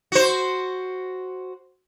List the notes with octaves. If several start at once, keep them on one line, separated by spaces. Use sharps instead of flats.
F#4 C5